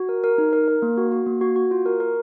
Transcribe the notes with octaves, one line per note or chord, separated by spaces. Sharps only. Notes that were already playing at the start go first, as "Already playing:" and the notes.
Already playing: F#4
A#4
A#4
D#4
A#4
A#4
A#3
F#4
F#4
A#3
F#4
F#4
F4
A#4
A#4